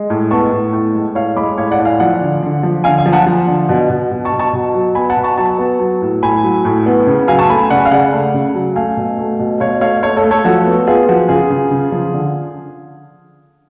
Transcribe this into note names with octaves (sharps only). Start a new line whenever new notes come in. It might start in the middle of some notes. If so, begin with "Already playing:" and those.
Already playing: G#3
A2
B3 A5 C#6
A2
A2
G#3
A2 C#5 F5
G#3 B5 D6
A2 C#5 F5
D5 F#5
A2
F5 G#5
F3 D5 F#5
D3
D3
F3
D3 F5 G#5
F5 G#5
F3
F#5 A5
F3
D3
B2
B2
B2
A5 C#6
B2
A5 C#6
B2
F#3
B3 G#5 B5
F#5 A5
B2
A5 C#6
F#3 A5 C#6
B3
F#3
A2
A2 G#5 B5
F#3
A2
B3
C#3
F#3 F5 G#5
A5 C#6
A3 G#5 B5
C#3 D5 F#5
F5
C#3 D5 F#5
A3
C#3
F#3
A3 F5 G#5
B2
A3
B2
B2 C#5 F5
A3 C#5 F5
A3 C#5 F5
A4 C#5
A3
A4 C#5
F3 F#4 A4
B3
B3 F4 G#4
F3 F#4
C#3 F4 G#4
C#3
C#3
F3
D3